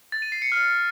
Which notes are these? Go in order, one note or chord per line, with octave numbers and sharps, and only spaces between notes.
A6
D#7
C7
C#7
F6